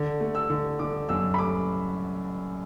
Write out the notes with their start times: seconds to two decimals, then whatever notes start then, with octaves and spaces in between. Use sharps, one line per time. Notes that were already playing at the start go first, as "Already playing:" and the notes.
Already playing: D3
0.20 A3
0.35 E6
0.50 D3
0.79 D3 D6
1.09 F#2 E6
1.34 B5
1.38 A3 D6